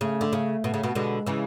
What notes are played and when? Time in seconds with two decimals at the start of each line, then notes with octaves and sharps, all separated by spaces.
0.01 C#3 A3
0.21 D3
0.33 C#3
0.64 B2
0.74 C#3
0.83 B2
0.95 B2 D3 G#3
1.26 C#3 E3